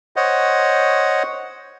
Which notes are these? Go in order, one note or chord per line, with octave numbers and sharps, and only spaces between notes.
C5 C#5 D#5 F#5